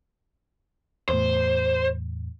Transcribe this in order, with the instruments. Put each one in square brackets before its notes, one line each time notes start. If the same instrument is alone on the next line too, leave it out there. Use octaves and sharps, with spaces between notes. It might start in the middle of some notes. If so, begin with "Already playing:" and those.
[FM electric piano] E2 A2 [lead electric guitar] C5